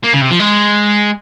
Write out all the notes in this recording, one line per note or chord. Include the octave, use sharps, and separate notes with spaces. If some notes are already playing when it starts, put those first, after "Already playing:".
A#3
C#3
C3
F3
G#3